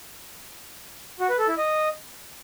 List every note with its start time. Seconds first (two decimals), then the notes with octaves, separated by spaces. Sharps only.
1.20 F#4
1.29 B4
1.39 A4
1.48 E4
1.57 D#5